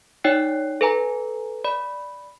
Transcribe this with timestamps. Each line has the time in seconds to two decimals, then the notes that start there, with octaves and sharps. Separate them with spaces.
0.24 D#4 C#5 D5 G5 F#6 C7
0.81 A4 B4 G#5 A#5
1.64 D5 B5